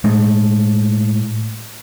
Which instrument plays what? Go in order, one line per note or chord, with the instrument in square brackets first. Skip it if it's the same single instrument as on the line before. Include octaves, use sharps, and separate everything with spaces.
[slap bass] A2 G#3 A3